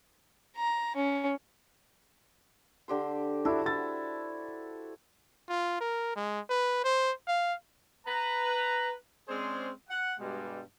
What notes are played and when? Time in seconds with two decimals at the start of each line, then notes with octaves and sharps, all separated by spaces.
0.57 A#5
0.96 C#4
2.88 D3 G4 C5
3.45 D4 E4 F#4 A4
3.66 E4 A6
5.49 F4
5.80 A#4
6.16 G#3
6.50 B4
6.84 C5
7.28 F5
8.06 B4 A#5
9.29 G#3 C4 C#4 G#4 C5 D5
9.89 F#5
10.19 G2 B2 G3 G#3